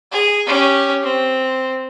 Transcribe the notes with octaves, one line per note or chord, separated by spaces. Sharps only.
G#4
C#4 G4
C4